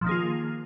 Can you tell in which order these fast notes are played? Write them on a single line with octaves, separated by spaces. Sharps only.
F3 D#3 A#3 G#4 F4